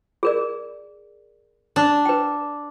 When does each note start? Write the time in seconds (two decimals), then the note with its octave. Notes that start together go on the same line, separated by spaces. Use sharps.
0.23 G#4 A#4 D5
1.76 D4
2.05 B4 G5